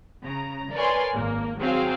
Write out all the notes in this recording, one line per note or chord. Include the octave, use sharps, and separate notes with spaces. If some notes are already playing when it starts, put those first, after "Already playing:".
C#3 A#5
A#4 B4 C#5 D5 G#5 C6
G#1 A#3
F#3 C4 G#4 F5 G5